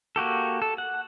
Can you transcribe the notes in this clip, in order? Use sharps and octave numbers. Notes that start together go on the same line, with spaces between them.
A#3 F#4 G4 A4
A4
F#5